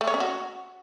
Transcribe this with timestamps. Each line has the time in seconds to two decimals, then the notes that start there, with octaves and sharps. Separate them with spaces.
0.01 A3
0.07 C#5
0.14 C#4
0.20 F#4